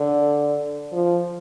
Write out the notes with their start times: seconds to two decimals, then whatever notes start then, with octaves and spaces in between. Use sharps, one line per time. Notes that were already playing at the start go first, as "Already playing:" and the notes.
Already playing: D3
0.92 F3